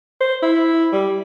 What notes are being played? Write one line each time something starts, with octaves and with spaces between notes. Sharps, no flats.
C5
E4
G3